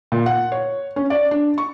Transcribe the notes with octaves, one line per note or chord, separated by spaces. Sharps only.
A#2
F#5
C#5
C#4
D5
D4
C#6